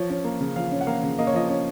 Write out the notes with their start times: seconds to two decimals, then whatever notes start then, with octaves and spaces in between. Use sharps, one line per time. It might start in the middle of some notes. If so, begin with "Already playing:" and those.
Already playing: F3 C#5
0.10 C#4
0.24 A#3
0.41 C#3
0.56 F3 F5
0.72 C#4
0.81 F#5
0.87 A#3 F5
1.03 C#3
1.19 A#3 D#5
1.27 C#5
1.33 F3 D#5
1.49 C#4 C#5